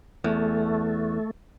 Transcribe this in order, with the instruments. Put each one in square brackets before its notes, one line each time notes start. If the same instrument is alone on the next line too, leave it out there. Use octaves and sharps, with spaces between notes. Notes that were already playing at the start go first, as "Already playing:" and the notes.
[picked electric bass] E2 [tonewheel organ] A3